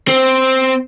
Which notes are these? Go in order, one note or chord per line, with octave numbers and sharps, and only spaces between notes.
C4